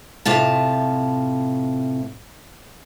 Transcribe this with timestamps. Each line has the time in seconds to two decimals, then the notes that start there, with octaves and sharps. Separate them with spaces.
0.25 A2 C3 F4 A5